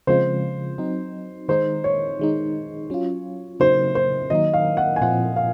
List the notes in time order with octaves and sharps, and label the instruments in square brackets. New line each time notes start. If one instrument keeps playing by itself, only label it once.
[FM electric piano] C#3 F3 G#3 C4 F4 [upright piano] C5
[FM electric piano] F#3 C4 D#4
[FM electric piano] D#3 G#3 D#4 [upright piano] C5
[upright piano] C#5
[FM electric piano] D#3 G#3 D#4
F#3 C#4 F4
[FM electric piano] C#3 F#3 A#3 D#4 [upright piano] C5
[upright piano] C5
[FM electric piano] D#3 F#3 A#3 D#4 [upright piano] D#5
[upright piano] F5
F#5
G#5
[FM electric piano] A#2 F3 C4 F4 [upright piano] F#5
[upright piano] F5